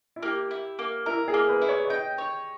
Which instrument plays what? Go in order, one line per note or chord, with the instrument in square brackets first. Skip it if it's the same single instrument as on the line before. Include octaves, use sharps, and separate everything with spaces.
[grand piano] E4
[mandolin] A#3 [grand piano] G4
[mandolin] E4
A#3
[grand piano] E4 [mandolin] A#4
[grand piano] G#4
[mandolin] A#3
[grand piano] B4
[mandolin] E4
[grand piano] C#5
C#5
[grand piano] D#5 [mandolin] G5
[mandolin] C#5